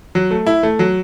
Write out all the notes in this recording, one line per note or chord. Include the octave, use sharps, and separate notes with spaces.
F#3
A3
E4
A3
F#3